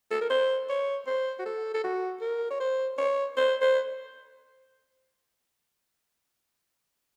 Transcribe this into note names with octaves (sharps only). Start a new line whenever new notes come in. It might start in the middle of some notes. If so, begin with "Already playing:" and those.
A4
A#4
C5
C#5
C5
F#4
A4
A4
F#4
A#4
C#5
C5
C#5
C5
C5